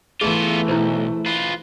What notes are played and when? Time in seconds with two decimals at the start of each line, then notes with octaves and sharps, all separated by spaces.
0.21 E3 A3 B3 F4 G#4
0.68 B1 E4 C5
1.26 F4 B4